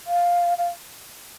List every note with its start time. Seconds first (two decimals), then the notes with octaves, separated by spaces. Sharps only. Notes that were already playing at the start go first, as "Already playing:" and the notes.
0.07 F5
0.58 F5